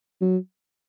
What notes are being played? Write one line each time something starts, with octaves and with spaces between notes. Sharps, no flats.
F#3